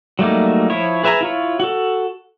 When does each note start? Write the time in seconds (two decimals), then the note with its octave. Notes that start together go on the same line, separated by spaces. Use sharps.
0.19 F#3 G3 A3 A#3 D#4
0.70 F3 E4 C#5
1.04 G#4 B4 E5 G#5 A#5
1.21 E4 F4 C#5
1.60 F#4 A4